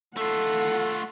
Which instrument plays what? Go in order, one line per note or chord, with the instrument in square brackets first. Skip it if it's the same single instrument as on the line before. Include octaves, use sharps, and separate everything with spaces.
[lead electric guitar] A3 F4 [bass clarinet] A4 [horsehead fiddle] F#5